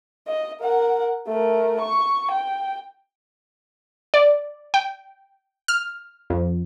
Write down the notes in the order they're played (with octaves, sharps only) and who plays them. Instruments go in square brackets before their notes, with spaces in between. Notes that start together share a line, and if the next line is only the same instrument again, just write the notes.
[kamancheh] D#5
A#4 F#5
A3 A#4
C#6
G5
[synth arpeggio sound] D5
G5
F6
F2